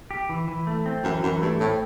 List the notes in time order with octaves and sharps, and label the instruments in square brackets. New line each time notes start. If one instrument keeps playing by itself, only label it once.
[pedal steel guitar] G4
E3
E3
A3
C4
[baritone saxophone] F#2 [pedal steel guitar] E3
[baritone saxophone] F#2 [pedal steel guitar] E3
[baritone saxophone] G2 [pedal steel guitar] A3
[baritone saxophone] A2 [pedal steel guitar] C4